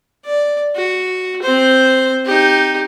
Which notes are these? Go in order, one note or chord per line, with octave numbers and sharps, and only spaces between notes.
D5
F#4
C4 C5
D#4 G4